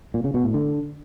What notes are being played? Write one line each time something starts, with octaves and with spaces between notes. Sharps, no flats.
A#2
C#3
B2
A2
D3